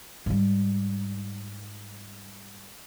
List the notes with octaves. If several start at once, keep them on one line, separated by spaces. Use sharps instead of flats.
G#2 G3